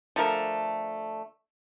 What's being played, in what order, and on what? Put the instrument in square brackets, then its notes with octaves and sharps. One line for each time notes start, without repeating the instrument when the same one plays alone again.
[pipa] D3 F3 A3 A#4